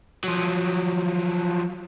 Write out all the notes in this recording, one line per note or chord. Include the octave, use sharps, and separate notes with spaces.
F3 F#3